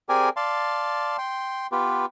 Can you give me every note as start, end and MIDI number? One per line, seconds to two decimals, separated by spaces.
0.09 0.29 60
0.09 0.29 67
0.09 0.29 68
0.09 0.29 70
0.09 0.29 74
0.09 0.29 80
0.36 1.17 74
0.36 1.17 77
0.36 1.17 81
0.36 1.17 84
1.18 1.67 79
1.18 1.67 84
1.72 2.06 59
1.72 2.06 65
1.72 2.06 67
1.72 2.06 71